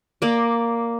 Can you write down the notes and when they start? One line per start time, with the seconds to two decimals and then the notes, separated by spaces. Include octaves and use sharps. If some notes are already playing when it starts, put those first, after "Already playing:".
0.22 A#3 D5